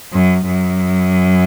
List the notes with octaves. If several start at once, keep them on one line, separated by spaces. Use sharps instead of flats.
F#2
F#2